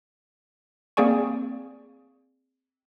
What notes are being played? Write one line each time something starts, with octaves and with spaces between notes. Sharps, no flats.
A#3 C4 G#4 D5 G#5 C#6